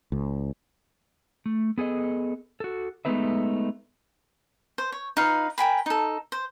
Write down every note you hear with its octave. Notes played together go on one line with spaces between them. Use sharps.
C#2
A3
B3 G#4 A4 D#5
F#4 A4
G#3 A3 B3 D#4 B4 E5
C5
C#5
D#4 F4 B4 F5
A#4 G5 G#5 B5
D#4 A4
C5